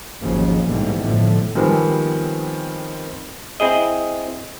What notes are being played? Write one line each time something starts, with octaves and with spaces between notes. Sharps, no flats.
G#1 D#2 C#3 F3 F#3
A#1 G#2 B2 D3 E3 G3
A2 D3 F3 A3
D#3 F3 G3 G#3 B3 C4
C4 E4 G#4 D#5